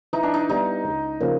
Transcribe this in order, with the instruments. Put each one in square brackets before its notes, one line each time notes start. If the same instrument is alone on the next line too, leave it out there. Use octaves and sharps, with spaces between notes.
[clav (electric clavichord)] E3 [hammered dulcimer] D#4
[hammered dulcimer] D4
D#4
[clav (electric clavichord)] G3 B3 E4 [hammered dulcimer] D#4
[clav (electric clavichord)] C#2
C#3 F3 A#3 C#4